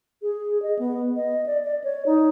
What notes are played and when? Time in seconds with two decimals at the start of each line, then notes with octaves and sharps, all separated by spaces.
0.22 G#4
0.62 D#5
0.79 B3
1.16 D#5
1.46 D5
1.64 D5
1.84 C#5
2.06 D#4